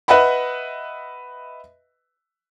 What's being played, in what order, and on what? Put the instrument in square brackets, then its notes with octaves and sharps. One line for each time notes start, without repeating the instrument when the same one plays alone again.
[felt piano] B4 D#5 E5 F#5 B5